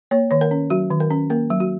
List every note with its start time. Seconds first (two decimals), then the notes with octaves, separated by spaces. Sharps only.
0.11 A#3 C#5
0.31 D#3 C#5
0.41 A#4
0.51 C#4
0.70 F#3 F#4
0.91 D#3
1.00 A#4
1.11 C#4
1.30 A#3 A#4
1.50 F#3
1.60 F#4